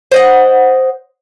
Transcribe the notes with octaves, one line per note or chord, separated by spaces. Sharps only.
C5 D#5 F#5